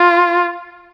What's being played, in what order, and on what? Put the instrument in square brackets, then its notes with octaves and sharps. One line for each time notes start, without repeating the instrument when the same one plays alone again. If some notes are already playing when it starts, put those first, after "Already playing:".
Already playing: [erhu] F4